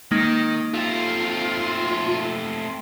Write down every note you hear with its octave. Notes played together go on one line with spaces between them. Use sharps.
D#3 G#3 A#3 D#4
A3 C4 F4